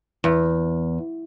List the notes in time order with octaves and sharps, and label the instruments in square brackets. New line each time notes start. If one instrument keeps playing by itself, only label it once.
[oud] E2